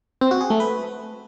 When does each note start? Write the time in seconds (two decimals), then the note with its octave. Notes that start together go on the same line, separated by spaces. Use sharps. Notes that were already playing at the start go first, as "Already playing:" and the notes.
0.21 C4
0.31 F#4
0.41 G#4
0.50 A3
0.60 B4